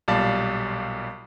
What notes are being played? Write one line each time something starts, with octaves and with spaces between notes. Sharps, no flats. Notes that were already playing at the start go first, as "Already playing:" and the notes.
B1 A#2 G3 D5 F5 A5